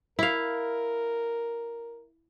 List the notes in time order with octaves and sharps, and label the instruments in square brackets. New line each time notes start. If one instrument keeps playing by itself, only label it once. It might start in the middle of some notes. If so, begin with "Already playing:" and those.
[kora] E4 F5 [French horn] A#4